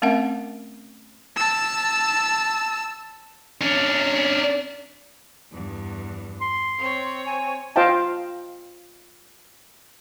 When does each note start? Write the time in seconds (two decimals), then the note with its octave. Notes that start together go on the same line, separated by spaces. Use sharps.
0.02 A3 C4 C#4 A#4 E5 F#5
1.36 A5 E6
3.61 C#4 D4
5.52 E2 G2
6.41 C6
6.79 C4 C#5
7.27 G#5
7.76 F4 C5 D#5 F5 G5 A5